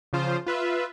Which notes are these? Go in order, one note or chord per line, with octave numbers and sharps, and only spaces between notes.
C#3 F3 F4 C5
F4 B4 E5